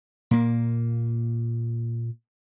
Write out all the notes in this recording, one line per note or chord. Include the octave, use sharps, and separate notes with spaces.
A#2 A#3